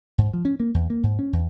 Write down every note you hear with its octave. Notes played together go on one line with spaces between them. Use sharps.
G#2
F3
C#4
A#3
E2
A#3
G#2
C#4
E2